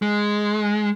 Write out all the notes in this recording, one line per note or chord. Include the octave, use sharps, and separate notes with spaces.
G#3